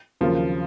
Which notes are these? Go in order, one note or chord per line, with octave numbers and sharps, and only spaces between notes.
D#2 C#3 F3 F#3 A#3 F4